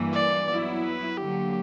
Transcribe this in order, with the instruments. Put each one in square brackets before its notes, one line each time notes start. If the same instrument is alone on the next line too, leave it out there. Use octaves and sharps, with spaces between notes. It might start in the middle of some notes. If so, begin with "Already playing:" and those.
Already playing: [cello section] G2 E3 A#3
[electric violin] D5
[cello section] F#3 B3 E4
[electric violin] B4
[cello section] D3 F#3 A#3 [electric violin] G4